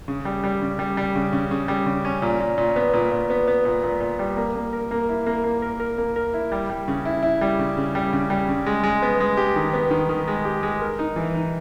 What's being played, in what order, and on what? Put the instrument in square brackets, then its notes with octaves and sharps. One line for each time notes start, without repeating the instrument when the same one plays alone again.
[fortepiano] C#3
G3
G3
C#3
G3
G3
C#3
C#3
C#3
G3
C#3
C#4
A#2
A#2
A#2
B3
A#2
A#2
B3
B3
A#2
A#2
A#2
G3
A#3
A#3
A#4
A#3
E4
A#3
A#3
A#4
A#4
A#3
A#4
E4
G3
G3
C#3
E4
E4
G3
C#3
C#3
G3
C#3
G3
C#3
G#3
G#3
B3
G#3
G4
D#3
B3
D#3
D#3
G#3
G4
G#3
A#4
D#4
E3
D#4